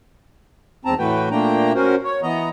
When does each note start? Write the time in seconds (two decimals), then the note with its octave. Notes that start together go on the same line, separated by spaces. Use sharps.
0.85 E2 G#2 C4 A5 A#5
0.99 A2 E3 A3 F#4 B4 G5
1.31 A#2 A3 A#3 D4 G5 A#5
1.75 C#4 F#4 A#4 C5
2.04 C#5
2.23 E3 B3 D#5 A#5